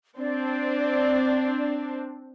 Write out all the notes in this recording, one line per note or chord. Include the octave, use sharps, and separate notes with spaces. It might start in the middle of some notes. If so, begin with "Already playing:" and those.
C4 D4 D5